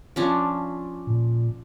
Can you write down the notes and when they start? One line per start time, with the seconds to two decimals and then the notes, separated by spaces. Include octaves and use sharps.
0.16 F3 C#4 D4
1.07 A#2